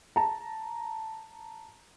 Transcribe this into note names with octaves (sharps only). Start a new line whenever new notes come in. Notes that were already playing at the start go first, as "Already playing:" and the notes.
A5 A#5